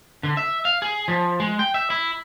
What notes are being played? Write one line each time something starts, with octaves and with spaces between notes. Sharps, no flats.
D3
E5
F5
G#4
F3
G#3
G5
E5
E4